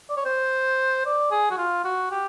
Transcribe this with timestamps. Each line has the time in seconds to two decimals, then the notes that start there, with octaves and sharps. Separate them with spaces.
0.09 D5
0.17 C#5
0.25 C5
1.06 D5
1.31 G#4
1.51 F#4
1.57 F4
1.84 F#4
2.11 G4